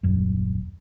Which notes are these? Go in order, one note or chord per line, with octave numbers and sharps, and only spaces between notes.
D#1 A#1 F#2